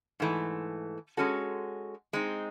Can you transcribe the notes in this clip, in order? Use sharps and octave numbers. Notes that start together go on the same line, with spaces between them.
G#2 E3 A3
G#3 C#4 F#4 A4
G#3 C4 D#4